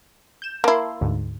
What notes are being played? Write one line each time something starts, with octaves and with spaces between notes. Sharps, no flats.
G6 E7
A#3 E4 A#4 A5 C6
D2 G#2